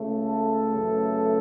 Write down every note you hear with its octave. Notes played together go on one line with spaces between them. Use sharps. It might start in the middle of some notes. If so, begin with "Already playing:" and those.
Already playing: C#2 C#3 A3
A4
F#2 C#3 E3 A3